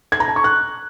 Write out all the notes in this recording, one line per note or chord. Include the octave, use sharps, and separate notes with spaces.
G#6
A#5
A5
C#6
F#6